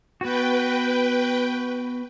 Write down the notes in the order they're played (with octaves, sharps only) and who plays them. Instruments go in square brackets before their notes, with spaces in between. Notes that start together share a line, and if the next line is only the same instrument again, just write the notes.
[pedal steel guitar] B3 F#4 [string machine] B4 G5